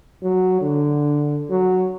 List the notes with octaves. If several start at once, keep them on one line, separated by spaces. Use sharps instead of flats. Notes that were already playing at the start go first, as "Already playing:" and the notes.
F#3
D3
F#3